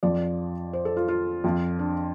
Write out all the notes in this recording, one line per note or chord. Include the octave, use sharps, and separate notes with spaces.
F2 F3 D5
C5
A4
F4
F4
F2 F3
D4